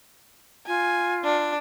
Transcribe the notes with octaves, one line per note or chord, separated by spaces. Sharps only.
F4 G#5
D4